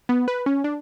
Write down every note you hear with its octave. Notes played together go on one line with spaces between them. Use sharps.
B3
B4
C#4
D4